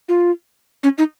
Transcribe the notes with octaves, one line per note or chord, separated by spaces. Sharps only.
F4
C#4
D#4